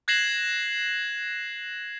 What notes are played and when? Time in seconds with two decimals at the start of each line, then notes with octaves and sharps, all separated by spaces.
0.08 F#6 G#6 A#6 C7 E7 F#7